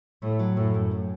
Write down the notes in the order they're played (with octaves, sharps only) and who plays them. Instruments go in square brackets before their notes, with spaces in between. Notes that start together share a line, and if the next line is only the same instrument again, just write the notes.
[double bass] A2 [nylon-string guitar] A3
[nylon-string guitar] F#3
[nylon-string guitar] F#2 [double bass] A2
[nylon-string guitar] F#2
A3